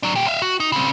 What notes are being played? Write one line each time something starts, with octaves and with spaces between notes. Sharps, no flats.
F#3 D4
A#2 G4
E5 F5
F#4
D#4
C#3 C4